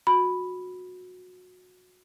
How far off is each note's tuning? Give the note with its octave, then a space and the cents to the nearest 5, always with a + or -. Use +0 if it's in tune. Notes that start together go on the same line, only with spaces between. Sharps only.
F#4 -25 B5 +0